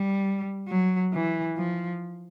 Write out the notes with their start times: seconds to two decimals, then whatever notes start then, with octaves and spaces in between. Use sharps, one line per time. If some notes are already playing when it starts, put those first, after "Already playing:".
Already playing: G3
0.68 F#3
1.13 E3
1.57 F3